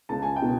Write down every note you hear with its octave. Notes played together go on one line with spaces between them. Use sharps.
C#2 A5
G#5
G5
B2